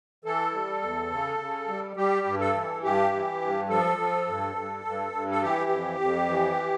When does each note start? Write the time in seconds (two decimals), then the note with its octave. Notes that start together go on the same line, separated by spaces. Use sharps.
0.25 E3 A4
0.53 G3
0.82 E2
1.10 C#3
1.39 C#3
1.68 G3
1.96 G3 G4
2.26 G2
2.40 A4
2.54 E3
2.84 G2 G4
3.12 E3
3.41 G2
3.69 F3 A4
3.98 F3
4.27 G2
4.55 G2
4.85 G2
5.13 G2
5.31 A4
5.42 E3 G4
5.70 F2
6.00 F2
6.28 E3